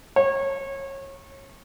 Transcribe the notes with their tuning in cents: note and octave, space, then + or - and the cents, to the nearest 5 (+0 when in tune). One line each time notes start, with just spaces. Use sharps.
C#5 -25